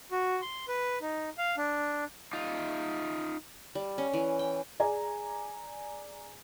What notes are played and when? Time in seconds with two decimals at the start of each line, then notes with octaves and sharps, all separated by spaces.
0.11 F#4
0.42 C6
0.68 B4
1.01 D#4
1.38 F5
1.57 D4
2.33 D#4 F4
3.75 G3
3.98 C#4
4.13 E3
4.39 G5
4.80 G#4 D5 G#5 A#5